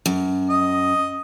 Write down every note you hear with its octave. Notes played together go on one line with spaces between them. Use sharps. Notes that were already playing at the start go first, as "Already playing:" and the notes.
F#2
D#5